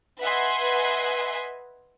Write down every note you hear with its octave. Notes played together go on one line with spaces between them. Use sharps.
B4 D#5 E5 F#5 G#5 C6